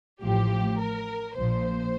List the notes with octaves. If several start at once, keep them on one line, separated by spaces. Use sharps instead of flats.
A1 A2 F3 G4
A#4
A#1 A#2 F3 C5